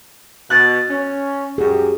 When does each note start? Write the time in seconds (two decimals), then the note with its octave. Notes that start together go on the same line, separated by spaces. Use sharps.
0.50 B2 F#6 A6
0.89 C#4
1.58 F#2 G4 G#4